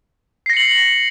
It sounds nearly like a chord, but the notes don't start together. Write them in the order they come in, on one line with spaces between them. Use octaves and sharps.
C7 A#6 C#7 F#7